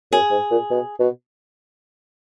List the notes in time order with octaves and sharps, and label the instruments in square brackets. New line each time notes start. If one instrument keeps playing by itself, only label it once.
[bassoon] F#2 [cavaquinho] G#4
[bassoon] G#2
A#2
B2
B2